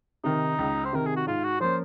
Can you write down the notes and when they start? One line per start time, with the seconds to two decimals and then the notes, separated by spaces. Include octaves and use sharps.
0.24 C3 D#3 D#4
0.59 C#2
0.85 C5
0.93 C3 D#3 A#4
1.06 G#4
1.16 F#4
1.27 G#2 F4
1.44 F#4
1.61 F3 A#3 C#4 C5